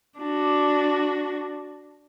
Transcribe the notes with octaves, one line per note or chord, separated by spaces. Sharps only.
D4 F#4